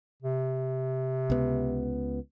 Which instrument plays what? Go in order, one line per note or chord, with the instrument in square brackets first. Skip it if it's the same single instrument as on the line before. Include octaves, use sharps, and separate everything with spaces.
[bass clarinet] C3
[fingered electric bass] C#2 B3